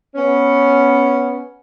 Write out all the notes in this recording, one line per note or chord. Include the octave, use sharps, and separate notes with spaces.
B3 C#4